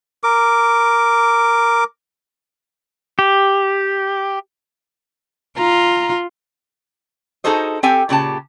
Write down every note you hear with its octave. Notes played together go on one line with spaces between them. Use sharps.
A#4 D6
G4
F4 A#5
D#4 F#4 G#4 A4 C5 D#5
C4 G4 A4 G5 G#5
A#2 C#3 G4 A5